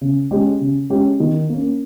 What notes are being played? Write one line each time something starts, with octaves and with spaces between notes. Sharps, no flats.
C#3
G#3 C#4 G4
C#3
G#3 C#4 G4
D#3
A#3 C#4